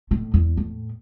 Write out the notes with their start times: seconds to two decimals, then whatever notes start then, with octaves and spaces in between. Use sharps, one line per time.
0.11 A2 D#3
0.34 E2
0.57 A2